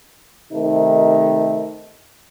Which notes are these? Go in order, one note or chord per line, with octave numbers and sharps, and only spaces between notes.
C3 D#3 A3 D#4